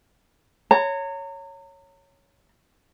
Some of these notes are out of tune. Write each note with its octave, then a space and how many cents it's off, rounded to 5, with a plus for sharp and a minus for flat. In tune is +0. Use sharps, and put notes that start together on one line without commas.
C#5 +0 A#5 -35